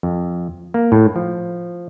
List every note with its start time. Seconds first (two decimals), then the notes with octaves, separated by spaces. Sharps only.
0.03 F2
0.74 A#3
0.92 A2
1.16 F3